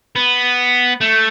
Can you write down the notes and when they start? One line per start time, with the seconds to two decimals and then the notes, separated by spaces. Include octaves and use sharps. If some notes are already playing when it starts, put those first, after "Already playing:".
0.16 B3
1.01 A3